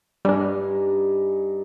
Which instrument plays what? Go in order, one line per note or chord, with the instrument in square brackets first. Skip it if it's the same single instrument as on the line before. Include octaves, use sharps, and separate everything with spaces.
[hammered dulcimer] G2 D#4 G#5 [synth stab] G3 D4